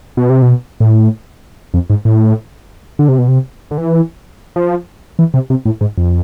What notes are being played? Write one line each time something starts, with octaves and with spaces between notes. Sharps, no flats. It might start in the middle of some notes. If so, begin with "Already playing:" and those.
B2
C3
B2
A2
F2
G#2
A2
D3
C3
B2
C3
D3
E3
F3
E3
C3
C3
A2
G#2
F2